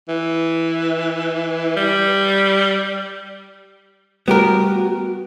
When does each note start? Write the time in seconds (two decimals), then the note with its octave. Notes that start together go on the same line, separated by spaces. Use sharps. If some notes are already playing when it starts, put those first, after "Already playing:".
0.08 E3
1.76 G3
4.28 G3 A3 B3 F#4 G4 A#4